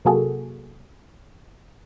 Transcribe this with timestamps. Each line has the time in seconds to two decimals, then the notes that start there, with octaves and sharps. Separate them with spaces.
0.05 C3 F#3 A#3 F#4 G#4 A4